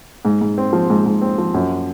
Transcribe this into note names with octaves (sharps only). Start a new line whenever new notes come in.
G#2
G#2
C4
F3
G#2
G#2
C4
F3
F#2